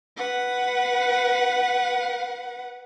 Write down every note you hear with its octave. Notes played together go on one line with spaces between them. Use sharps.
B4 F#5